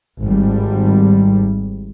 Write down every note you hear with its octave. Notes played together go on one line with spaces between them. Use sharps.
G#1 G3